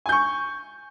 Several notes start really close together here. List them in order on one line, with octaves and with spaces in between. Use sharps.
G#5 G6 C#6